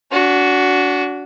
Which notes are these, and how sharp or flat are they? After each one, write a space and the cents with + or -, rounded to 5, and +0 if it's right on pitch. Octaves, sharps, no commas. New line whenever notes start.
D4 -30 F#4 +0